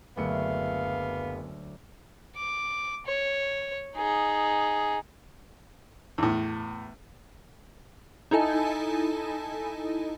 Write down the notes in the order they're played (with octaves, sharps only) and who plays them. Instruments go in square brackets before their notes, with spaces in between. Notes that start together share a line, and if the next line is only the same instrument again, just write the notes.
[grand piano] F#1 C#7 [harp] D2 D3 F#3 [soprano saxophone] B3 [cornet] F5
[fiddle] D6
C#5
D#4 G#4
[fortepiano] E2 A2
[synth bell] D#4 E4 A4 D#5 G#5 A5